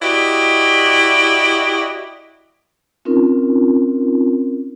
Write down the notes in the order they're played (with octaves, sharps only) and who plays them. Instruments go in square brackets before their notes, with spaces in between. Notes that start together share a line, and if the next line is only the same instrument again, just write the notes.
[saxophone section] E4 F#4 G4 D5 D#5
[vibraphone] C4 C#4 D#4 F4 A#4